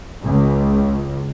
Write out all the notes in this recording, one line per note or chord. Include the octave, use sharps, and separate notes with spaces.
C#2